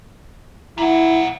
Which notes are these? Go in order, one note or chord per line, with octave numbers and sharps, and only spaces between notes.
A#2 E4 F#5